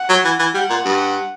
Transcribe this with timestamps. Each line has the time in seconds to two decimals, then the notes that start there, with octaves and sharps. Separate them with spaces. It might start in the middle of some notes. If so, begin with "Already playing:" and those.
Already playing: F#5
0.09 F#3
0.24 E3
0.39 E3
0.54 G3 F#5
0.70 A#2
0.85 G2